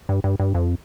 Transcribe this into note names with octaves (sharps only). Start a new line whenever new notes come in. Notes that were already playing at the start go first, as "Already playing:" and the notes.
G2
G2
G2
F2